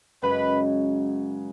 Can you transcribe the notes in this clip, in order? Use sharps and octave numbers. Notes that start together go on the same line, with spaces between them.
F#2 C#3 G#3 B4